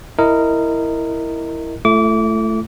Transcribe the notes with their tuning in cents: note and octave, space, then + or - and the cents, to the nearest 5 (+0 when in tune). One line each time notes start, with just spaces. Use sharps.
E4 +0 A#4 -15 D#5 +0
A3 +0 E4 +40 D6 -30